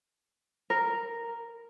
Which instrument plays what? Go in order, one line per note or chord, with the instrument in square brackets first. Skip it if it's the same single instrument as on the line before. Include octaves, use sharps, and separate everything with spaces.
[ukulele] A#4